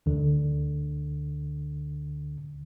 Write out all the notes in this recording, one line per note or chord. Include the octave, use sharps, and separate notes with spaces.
D2 D3